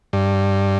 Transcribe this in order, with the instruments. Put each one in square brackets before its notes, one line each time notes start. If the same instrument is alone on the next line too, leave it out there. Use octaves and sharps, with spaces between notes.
[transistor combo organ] G2